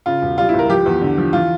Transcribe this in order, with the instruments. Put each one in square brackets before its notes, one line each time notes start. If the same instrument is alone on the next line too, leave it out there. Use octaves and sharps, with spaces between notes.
[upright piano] C#3 F4
E1
G3 F4
E4
C#2
A#4
F3 G4
E2
D3
F3
E3 F4